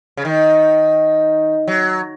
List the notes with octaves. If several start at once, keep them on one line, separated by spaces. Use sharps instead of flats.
C#3
D#3
F#3